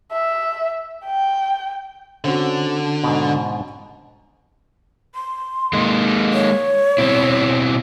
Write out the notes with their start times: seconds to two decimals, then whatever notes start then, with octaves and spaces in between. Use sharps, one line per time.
0.12 E5
1.05 G5
2.25 D3 C4 C#4 F#4
3.04 G#2 B2
5.15 C6
5.73 G#3 A#3 D#4
6.34 C#5
6.98 B2 C4 E4